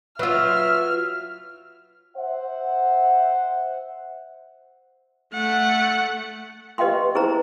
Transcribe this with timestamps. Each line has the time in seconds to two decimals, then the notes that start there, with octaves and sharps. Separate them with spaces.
0.19 F#3 F4 B4 E5 E6 F6
2.16 C5 E5 F#5
5.34 A3 F#5
6.78 G4 B4 D#5 F5 G5 C6
7.15 E4 G#4 B4 C5 A#5